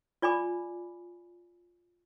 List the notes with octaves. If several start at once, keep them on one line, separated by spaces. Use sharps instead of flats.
F4 D5 G#5 B5 D6